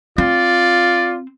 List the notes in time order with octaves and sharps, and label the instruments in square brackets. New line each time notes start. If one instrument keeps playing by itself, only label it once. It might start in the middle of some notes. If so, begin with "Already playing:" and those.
[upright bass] C4 [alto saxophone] F4 [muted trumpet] D5